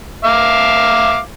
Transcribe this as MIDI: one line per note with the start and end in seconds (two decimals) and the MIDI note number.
0.25 1.18 76
0.25 1.18 77
0.25 1.18 86